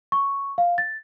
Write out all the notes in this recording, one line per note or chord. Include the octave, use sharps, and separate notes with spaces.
C#6
F5
A6